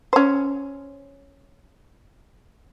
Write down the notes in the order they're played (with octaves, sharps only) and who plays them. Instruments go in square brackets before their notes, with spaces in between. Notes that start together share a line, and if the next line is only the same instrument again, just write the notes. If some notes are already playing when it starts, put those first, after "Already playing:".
[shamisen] C#4 C5